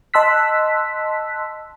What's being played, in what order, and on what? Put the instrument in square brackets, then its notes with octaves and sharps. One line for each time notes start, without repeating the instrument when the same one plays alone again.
[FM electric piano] D#5 A5 C6 E6 F#6 B6